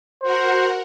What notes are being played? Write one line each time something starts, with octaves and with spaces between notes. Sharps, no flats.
F#4 A#4 C5 F#5